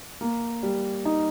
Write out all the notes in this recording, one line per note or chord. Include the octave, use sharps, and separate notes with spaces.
A#3
G3
D#4